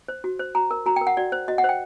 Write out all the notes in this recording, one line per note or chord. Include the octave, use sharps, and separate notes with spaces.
C5
F#4
C5
F#4 A#5
A#4
F#4 A#5
G5
A#4
F#5
F#4 D5
C5
F#4 D#5
F#5
C5 G5